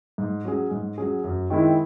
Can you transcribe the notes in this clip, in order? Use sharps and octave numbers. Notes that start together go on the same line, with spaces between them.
G#2
F#3 C#4 G#4
G#2
F#3 C#4 G#4
F#2
D#3 G#3 C4 E4